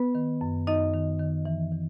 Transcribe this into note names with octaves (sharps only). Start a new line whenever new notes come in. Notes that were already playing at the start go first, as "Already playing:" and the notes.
Already playing: B3 B4
D#3
F#2
F#2 D#4 D#5
D#3
D#3
E3
E3